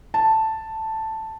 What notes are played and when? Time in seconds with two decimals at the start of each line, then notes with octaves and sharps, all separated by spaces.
0.14 A5